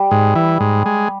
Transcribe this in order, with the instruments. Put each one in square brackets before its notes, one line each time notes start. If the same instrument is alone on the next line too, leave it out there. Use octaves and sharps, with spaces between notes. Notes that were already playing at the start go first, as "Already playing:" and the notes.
Already playing: [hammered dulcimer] G3
[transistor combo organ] G#2
E3
G#2
G#3